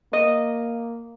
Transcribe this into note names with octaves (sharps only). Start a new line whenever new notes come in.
A#3 D#5